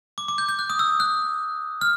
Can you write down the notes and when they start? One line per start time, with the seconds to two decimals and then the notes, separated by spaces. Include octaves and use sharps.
0.18 D6
0.28 D6
0.38 G6
0.49 G6
0.59 F#6
0.70 D#6
0.79 E6
1.00 F#6
1.81 F6